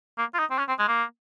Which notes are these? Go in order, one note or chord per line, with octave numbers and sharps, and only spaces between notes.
A#3
F4
D#4
C4
C#4
C4
G#3
A#3